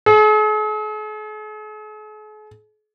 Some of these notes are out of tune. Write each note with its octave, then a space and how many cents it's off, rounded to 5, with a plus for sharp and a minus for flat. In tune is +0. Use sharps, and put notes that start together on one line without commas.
G#4 +45